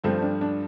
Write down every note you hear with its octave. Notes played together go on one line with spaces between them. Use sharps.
G2 F3 A3 C4
D4
D4